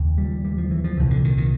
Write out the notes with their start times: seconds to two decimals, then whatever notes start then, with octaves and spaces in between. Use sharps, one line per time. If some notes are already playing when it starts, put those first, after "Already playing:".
Already playing: D#2 C#3
0.18 G3
0.45 G3
0.58 F3
0.71 E3
0.84 F3
0.97 C2 A#2 E3
1.10 D3
1.24 D#3
1.37 D#3